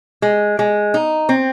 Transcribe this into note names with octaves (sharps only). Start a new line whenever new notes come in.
G#3
G#3
D#4
C4